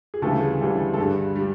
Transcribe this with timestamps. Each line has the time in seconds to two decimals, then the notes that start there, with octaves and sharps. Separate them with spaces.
0.14 G#4
0.22 D2 C#3 E3 G3 A3 A4
0.41 G#4
0.60 D2 C#3 E3 G3
0.94 A4
0.98 G2 D3 G3 G#4
1.36 D3 G3